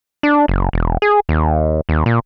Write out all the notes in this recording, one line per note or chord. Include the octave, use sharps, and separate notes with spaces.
D4
F#1
E1
G#4
D#2
D#2
A#2